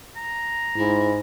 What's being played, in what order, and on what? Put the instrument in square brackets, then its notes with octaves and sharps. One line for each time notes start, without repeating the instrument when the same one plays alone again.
[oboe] A#5
[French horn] G#2 [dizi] E4